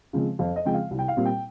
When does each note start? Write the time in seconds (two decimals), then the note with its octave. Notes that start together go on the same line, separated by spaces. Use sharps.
0.13 C#3 F3 G#3 C4
0.39 F2 F5
0.56 D#5
0.65 C#3 F3 G#3 C4 G5
0.74 F5
0.91 C2
0.99 G5
1.08 F5
1.17 A#2 G3 C4
1.25 G5